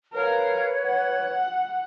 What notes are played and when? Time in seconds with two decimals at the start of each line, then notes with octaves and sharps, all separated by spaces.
0.13 A#4 B4 C#5 F5
0.86 F#5